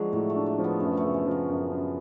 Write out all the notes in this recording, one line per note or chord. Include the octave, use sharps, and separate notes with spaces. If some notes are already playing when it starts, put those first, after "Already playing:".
Already playing: D3 F3 F#3 G#3 D4
A2 A3
A3
D4
A3
F3
B3
F#2 A3
A3
C#3
G#3
F3
F#3
F#2
F#2